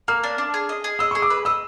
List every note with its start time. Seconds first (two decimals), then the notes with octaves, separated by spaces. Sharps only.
0.08 A#3 F6
0.24 D4
0.38 D4
0.54 G#4
0.69 D#5
0.84 G#4
0.99 D#5 E6
1.11 G#4 C#6
1.22 D6
1.30 B4
1.45 D#5 E6